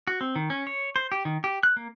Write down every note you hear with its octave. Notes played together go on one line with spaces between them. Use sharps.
F#4
C4
D#3
C#4
C#5
C5
G4
D#3
G4
F#6
A#3